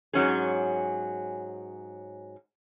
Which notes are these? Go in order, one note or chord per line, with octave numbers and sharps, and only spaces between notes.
G#2 F#3 C#4 G#4